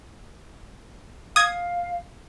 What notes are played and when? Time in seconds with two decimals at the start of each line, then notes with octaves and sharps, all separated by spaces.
1.36 F5 D#6 G#6